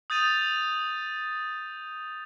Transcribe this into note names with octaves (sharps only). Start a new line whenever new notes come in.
D#6 G6 A6 D#7 F7